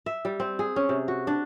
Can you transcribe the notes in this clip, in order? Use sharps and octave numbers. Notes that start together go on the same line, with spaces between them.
E5
G3
C4
G#4
C#4
C3
F#4
D4